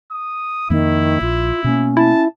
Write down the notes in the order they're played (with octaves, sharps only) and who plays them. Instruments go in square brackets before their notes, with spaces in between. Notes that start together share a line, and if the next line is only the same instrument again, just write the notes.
[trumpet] D#6
[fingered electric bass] F2 A#3 [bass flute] D#3 [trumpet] E4
[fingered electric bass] A#1 [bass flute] F4
[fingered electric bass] B2 A#3 [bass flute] C#4
[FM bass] E4 [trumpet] A5